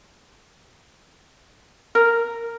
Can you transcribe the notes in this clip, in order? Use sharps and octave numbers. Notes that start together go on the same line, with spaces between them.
A#4